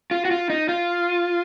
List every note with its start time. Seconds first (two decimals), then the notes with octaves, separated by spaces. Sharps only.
0.11 F4
0.25 F#4
0.31 F4
0.50 D#4
0.69 F4